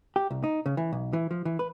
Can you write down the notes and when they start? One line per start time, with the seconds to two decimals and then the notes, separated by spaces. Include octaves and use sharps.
0.16 G4
0.31 C2
0.44 D#4
0.66 C#3
0.77 E3
0.92 B1
1.13 E3
1.31 F3
1.45 E3
1.59 B4